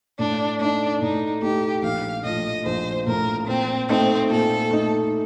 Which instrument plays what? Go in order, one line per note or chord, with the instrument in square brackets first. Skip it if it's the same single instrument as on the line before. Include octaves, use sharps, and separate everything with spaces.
[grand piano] A2 [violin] D4
[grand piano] A3 D#4 [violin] D4
[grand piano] A2 [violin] D#4
[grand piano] A3 D#4 [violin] G4
[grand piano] A#1 [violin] F5
[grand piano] A2 F3 [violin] D#5
[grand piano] A#1 [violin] C5
[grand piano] A2 F3 [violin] A#4
[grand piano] A#2 [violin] C4
[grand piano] A3 D#4 [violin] C4
[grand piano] A#2 [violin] A4
[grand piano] A3 D#4